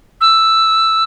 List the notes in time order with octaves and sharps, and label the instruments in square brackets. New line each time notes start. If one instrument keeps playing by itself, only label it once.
[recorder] E6